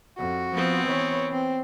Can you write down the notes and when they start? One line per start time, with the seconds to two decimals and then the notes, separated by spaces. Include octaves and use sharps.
0.18 F2 F#4
0.54 F3 B3 C4
0.87 E3 C#5
1.32 C4